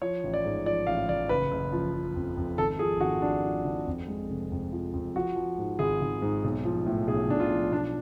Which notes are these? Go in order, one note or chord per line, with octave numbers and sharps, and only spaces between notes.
F3 C#5
A1
D5
G#2
F3 D5
A1 F5
A1 D5
F#1 B4
F#1
F3
F3
F2
F2
G#1 A4
F3 G#4
G#1 F#4
F3 D4
F3
G#1
F2
G#3
F1
F2
F3
F2
F3 F#4
F3
G#2
G#1 G#4
G#1
G#2
B1
F3
A2
B1 G#4
B1 D4
F4
F3
B1 D4